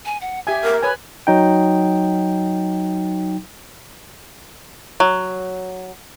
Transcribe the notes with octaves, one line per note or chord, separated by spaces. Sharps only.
G#5
F#5
G4 E5 G#5
A#4
B4 C#5 G#5
F#3 D#4 G5
F#3